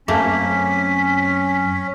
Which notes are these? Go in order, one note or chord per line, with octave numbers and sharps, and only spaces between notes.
F#2 A3 A#3 C4 C#4 B6